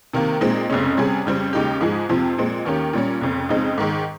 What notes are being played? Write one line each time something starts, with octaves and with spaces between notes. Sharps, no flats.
C3 D#3 A#3
A#2 G#3 C4 D#4
F1 F2 C#3 G#3 C#4
C3 G3 C#4 G#4
F2 C#3 G3 C4
D#2 C#3 G#3 D#4 G4
G#2 F3 G#3 D#4 G#4
F2 C3 F3 C4
A#2 G#3 C4
D#2 D#3 A#3 C#4 G4
A#2 G3 C#4
F1 F2 C#3
F2 C#3 G#3 C4 D#4
G#2 D#3 G#3